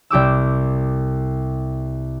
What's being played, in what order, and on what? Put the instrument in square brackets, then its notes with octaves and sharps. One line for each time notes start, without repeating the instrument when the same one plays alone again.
[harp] C2 G4 D6 E6